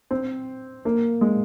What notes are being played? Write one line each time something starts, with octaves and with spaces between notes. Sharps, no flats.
C4
A#3
G#3